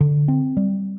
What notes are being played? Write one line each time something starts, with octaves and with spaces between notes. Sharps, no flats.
D3
C4
G3